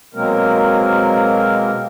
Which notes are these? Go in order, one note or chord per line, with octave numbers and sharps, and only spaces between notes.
B2 F#3 G#3 A#3 C4 A#4